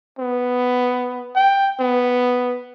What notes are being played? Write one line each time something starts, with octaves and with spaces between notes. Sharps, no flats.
B3
G5
B3